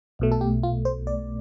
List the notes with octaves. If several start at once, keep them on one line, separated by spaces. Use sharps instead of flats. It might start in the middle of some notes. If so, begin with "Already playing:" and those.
B1 B2 A3
A4
G4
F4
C5
D5